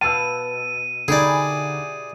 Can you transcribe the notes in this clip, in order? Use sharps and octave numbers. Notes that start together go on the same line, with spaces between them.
B2 F5 A5 E6 D#7
D3 D#4 E4 G4 G#4 D5 G#5